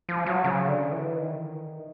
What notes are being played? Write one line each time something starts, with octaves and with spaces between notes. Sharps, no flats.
F3
F#3
C#3
D3
E3
D#3